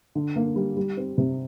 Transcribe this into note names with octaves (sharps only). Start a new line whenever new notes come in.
D3
A#3
G3
G3
C4
C3